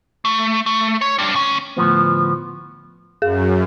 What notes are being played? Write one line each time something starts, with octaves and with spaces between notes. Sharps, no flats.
A3
A3
C#5
G3 D4
D2 C#4
D2 A2 F3 B3
F#2 G#4